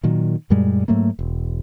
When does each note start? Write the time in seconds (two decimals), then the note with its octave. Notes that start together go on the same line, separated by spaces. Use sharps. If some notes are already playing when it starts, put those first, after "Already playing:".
0.04 A#2 D#3 F#3
0.50 F#2 A#2 G3 G#3
0.88 G#2 F#3 A3 A#3
1.19 E1